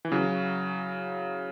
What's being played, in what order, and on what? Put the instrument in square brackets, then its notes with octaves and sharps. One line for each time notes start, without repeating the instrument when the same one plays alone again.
[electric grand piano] E3
C#3 F#3